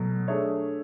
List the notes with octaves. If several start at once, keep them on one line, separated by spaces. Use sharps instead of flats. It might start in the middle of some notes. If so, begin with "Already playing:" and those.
Already playing: B2 F#3 A3
A3 D4 G#4 C#5 E5